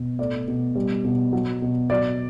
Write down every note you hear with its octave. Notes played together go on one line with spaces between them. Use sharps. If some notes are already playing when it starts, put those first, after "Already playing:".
Already playing: B2
A3 D5
B2
G3
B2
F#3
B2
F#3 D5